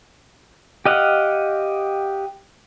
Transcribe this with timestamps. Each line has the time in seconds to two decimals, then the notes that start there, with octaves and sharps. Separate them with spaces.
0.86 G4 D#5 F5 F#5